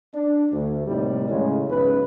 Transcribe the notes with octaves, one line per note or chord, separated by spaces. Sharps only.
D4
D2
D#2 A2 C3 D#3 G3
A2 C#3 G#3
B1 E2 G#2 C#3 C#4 B4